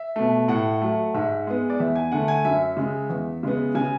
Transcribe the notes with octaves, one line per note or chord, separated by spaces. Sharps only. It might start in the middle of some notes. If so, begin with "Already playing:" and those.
Already playing: E5
B2 A3
A2 F#5
F#3 A3
G#2 E5
G#3 B3
D5
E2 E5
G#5
D3 A3 F#5
G#5
F#2 E5
C#3 G#3
E2
C#3 G#3 B3
C#3 G#5